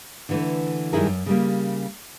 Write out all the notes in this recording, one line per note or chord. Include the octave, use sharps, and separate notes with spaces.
D3 E3 A3
F#2 D#3 G3 E4 G#4 A#4
F#2
C#3 G3 A#3